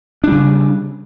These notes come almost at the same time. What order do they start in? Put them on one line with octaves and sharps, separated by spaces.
D4 G3 C#3